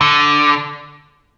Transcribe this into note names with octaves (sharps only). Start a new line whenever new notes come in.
D3